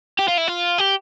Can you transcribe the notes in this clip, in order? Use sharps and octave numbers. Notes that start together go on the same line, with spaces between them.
G4
F4
E4
F4
G4